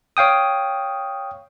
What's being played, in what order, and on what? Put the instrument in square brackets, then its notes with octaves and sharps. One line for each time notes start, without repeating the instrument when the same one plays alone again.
[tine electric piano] C#5 F5 G5 D#6